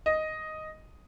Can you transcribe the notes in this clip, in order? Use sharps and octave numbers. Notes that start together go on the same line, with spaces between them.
D#5